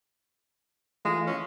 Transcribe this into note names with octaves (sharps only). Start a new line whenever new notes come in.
E3 G#3 A3 F4
C#4